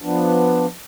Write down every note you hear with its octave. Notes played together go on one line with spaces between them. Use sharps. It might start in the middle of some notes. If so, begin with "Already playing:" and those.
F3 B3 D4